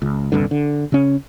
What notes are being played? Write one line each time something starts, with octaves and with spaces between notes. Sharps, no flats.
C#2
D#1 C2 G2 D3
D3
C#3 C#4